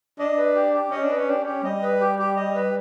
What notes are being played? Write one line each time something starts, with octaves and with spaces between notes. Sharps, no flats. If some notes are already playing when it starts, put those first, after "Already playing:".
D4 D#5
B4
G4
G4
C#4 D#5
D4
B4
C#4
D4 G4
C#4 G4
G3 D#5
B4
G4
G4
D#5
B4